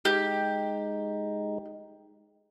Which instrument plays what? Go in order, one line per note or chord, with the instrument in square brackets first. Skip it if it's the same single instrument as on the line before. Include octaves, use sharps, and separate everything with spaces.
[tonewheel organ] G#3 D#4 [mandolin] G4